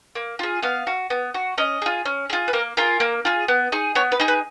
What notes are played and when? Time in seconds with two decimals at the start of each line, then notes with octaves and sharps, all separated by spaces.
0.15 A#3
0.39 F4 G#4
0.62 B3 F5
0.87 F#4
1.10 B3
1.34 F#4
1.58 C#4 D#5
1.82 F4 G#4
2.05 C#4
2.30 F4 G#4
2.48 B4
2.53 A#3 A#4
2.77 F4 G#4 A#4
3.00 A#3
3.25 F4 G#4
3.48 B3
3.72 D#4 G#4
3.95 B3 C#5
4.12 B4
4.20 D#4 G#4
4.28 B4